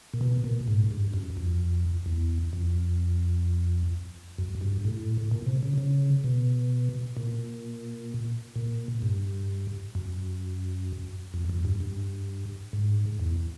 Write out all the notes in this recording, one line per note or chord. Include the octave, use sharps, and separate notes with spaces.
A#2
B2
A#2
G#2
G2
F#2
F2
E2
F2
F#2
G2
A2
A#2
C3
C#3
C#3
B2
A#2
A#2
G2
F#2
F2
F2
G2
G2
G#2
E2